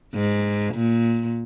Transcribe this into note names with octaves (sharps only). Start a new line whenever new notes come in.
G#2
A#2